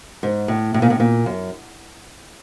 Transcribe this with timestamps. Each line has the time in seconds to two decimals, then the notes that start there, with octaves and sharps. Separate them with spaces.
0.23 G#2
0.48 A2
0.74 A2
0.82 A#2
0.90 A2
1.00 A#2
1.26 F#2